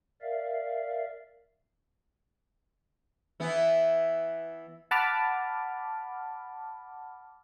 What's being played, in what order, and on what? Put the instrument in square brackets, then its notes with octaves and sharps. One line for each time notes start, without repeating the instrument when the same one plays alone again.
[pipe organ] A#4 D5 E5 F5
[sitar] E3 B3 E4
[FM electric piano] F#5 A5 B5 D6 F6